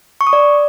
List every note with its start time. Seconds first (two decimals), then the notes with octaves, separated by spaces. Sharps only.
0.21 C#6
0.27 D#6
0.33 D5